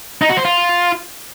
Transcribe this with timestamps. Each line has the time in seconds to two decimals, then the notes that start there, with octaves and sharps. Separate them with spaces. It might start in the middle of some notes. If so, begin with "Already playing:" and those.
0.22 D#4
0.29 F#4
0.37 C5
0.45 F4